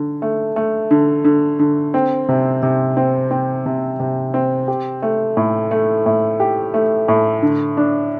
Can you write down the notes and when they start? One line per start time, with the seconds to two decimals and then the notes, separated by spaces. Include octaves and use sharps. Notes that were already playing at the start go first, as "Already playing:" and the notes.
Already playing: D3
0.22 A3
0.56 A3
0.91 D3
1.24 D3
1.59 D3
1.94 C4
2.29 C3
2.63 C3
2.97 C4
3.31 C4
3.66 C3
4.00 C3
4.34 C4
4.68 G4
5.02 A3
5.37 A2
5.71 A3
6.06 A2
6.40 G4
6.74 A3
7.08 A2
7.42 D3
7.77 D4